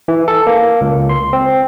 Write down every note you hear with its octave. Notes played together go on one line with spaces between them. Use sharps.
E3
A4
A#3
C#2
C6
C4